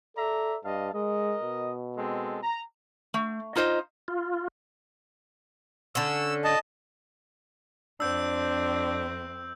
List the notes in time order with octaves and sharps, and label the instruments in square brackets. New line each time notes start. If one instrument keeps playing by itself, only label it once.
[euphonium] A4 [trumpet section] D5 E5 A#5
[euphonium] G2 [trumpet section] D#5 F5 A5
[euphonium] G#3 [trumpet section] A#4 D#5
[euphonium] B2
[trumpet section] G#3 C4 A4
A#5
[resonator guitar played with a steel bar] A3
D#4 F4 C5 D#5
[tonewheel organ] F4
[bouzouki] D3 C#4 [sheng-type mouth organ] E6
[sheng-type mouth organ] D#5 A5
[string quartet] F2 C4 [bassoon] D4 [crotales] E6 G6